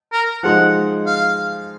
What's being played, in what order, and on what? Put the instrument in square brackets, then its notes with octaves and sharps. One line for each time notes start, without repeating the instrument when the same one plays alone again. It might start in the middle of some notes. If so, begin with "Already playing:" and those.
[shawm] A#4
[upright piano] F3 G#3 D#4 [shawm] F#5
[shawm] F5